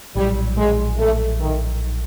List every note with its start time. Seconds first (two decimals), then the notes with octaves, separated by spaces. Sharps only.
0.15 A#1 A2 F#3 G3
0.58 G#3
0.99 A3
1.41 D#3